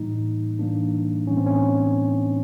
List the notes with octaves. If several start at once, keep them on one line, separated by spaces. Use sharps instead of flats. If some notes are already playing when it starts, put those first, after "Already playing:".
Already playing: A2 E3 G3 A#3 D#4
A2 E3 G3 A#3 D4
A2 E3 G3 A#3 C#4
C4
C#4